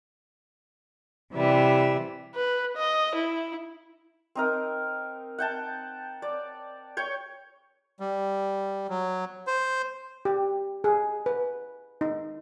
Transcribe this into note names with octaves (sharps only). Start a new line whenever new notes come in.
C3 E3 G3 E5
B4
D#5
E4
C4 D#4 A#4
F#5 G5 A5
D5
C#5 G5 C#6
G3
F#3
C5
G4
G#4
B4
D#4